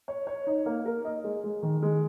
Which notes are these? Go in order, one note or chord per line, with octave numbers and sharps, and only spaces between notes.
C#5
C#5
D#4
A#3
A#4
D#5
G#3
G#3
D#3
G#3